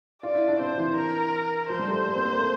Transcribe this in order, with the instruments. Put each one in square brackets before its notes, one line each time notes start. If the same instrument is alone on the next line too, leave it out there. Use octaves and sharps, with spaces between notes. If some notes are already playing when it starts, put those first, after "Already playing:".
[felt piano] F4 [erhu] D5
[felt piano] E4
D4
[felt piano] C4 [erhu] C5
[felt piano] E3
[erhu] A#4
[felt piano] F3 [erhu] C5
[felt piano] G3
A3
A#3
C4
A#3
A3